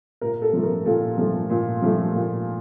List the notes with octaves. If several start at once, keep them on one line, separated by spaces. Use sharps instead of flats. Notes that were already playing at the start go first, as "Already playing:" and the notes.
A#2 A#4
A4
F3 A3
A#4
A#2 A4
F3 A3
A#2
F3 A3
A#2